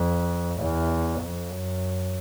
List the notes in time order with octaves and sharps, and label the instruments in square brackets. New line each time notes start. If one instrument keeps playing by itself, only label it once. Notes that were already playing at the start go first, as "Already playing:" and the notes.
Already playing: [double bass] F2
E2
F2
F#2